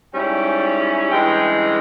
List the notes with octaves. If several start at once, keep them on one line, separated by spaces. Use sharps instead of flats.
G#2 G3 C#4 E4 G5
G2 E3 G#3 C#4 G5